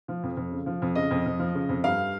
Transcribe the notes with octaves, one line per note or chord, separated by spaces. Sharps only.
F3
F2
F2
C#3
F3
F2
C#3 D#5
F2
F2
F3
C#3
F2
G2 F5